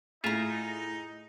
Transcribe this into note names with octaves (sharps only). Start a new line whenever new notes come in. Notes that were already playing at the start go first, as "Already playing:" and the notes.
A2 D#4 F4 G#4 E5 A#5